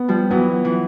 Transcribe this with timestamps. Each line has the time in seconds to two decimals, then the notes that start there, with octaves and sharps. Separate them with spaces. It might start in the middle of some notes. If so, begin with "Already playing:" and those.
Already playing: B3
0.08 F3 G3
0.31 E3 F#3 B3
0.65 E3